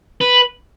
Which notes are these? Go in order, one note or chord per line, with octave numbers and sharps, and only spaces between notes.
B4